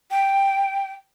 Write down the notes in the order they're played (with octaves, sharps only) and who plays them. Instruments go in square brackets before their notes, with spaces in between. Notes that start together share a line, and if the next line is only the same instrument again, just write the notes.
[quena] G5